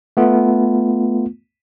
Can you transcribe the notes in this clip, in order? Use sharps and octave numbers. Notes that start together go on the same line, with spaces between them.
A3 B3 F4